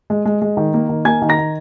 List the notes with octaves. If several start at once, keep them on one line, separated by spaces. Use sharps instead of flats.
G#3
G#3
G#3
D#3
A#3
D#3
A#3 G#5 G#6
D#3
A#5 A#6
D#3